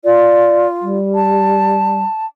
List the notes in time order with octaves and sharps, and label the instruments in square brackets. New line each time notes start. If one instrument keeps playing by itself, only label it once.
[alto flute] F4 [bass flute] D5
[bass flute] G3
[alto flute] A5